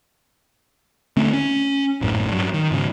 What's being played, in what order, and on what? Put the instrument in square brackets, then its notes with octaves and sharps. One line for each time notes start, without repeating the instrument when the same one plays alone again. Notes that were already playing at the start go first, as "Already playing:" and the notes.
[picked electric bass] D3 A3 C4 C#4
C#4
A1 F#2 A2
G2 F#3
D#3
G#2 C#3